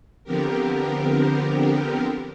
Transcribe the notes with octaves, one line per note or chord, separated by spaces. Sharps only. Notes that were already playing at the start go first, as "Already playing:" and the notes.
D3 F3 B3 C4 G4 A#4